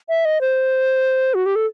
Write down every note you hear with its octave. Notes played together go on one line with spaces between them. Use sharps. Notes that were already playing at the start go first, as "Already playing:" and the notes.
E5
D#5
C5
F#4
G4
A4